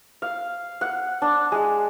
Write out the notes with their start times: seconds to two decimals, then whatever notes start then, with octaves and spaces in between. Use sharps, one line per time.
0.22 F5
0.81 F#5
1.22 D4
1.52 G#3